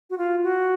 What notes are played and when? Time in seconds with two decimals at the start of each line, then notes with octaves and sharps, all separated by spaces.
0.10 F#4
0.18 F4
0.43 F#4